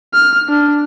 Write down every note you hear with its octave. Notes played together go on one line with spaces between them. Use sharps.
F6
D4